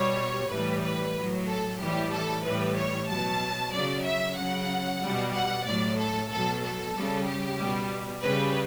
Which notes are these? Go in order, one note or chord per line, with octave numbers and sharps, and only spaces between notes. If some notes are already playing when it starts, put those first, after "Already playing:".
Already playing: B2 G3 C#5
A2 E3 G3 B4
B4
A2 F#3
A4
A2 E3 G3 G4
A4
A2 E3 G3 B4
C#5
B2 F#3 A5
C#3 F#3 D5
E5
C#3 F#3 F#5
B2 G3
F#5
A2 F#3 D5
A4
B2 F#3 A4
A4
C#3 G3
G4
B2 G3
C#3 G3 B4